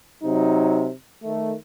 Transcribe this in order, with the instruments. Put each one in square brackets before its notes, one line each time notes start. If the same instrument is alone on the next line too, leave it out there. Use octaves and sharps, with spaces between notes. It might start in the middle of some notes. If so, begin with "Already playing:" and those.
[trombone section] C3 F#3 D#4
D#3 A3